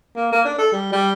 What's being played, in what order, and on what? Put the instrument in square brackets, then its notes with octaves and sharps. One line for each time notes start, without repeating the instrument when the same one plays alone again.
[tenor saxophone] A#3
A#3
D4
A4
G3
G3